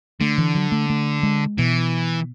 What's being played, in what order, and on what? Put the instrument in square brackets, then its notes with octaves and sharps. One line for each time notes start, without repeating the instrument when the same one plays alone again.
[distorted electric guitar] D3 [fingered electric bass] A3
[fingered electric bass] E3
F#3
A3
A3
G#3
[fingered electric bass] B2 [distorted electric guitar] E3